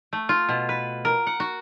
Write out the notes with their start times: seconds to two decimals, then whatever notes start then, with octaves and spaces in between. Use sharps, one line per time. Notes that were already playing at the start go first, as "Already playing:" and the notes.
0.13 A3
0.29 F4
0.49 B2
0.69 B4
1.05 A#4
1.27 F#5
1.40 F#4